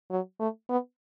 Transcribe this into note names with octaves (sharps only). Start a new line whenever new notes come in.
F#3
A3
B3